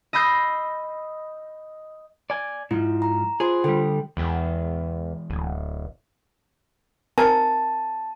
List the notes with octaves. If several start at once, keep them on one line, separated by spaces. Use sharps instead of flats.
D#5 B5 E6 G6 C7
D5 G#5
G#2 F3 E4
A#5
F4 G#4 C5 C6
D3 G3 A4 G5
E2 E3 G#3 G5
D1
C4 A#4 G#5 A5